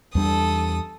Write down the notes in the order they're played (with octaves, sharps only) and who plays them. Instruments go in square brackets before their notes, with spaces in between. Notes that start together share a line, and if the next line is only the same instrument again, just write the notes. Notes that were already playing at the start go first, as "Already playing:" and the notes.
[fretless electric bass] E2 G3 D4 [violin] A4 D#6